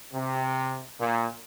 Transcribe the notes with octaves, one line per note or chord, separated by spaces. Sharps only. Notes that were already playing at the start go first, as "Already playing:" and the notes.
C3
A#2